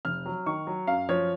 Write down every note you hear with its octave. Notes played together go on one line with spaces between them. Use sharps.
F1 F6
F#3
D#3 C#6
F#3
F#2 F5
F3 C#5